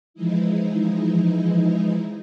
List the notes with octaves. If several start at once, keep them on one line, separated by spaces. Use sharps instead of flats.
E3 F3 G#3 D#4 E4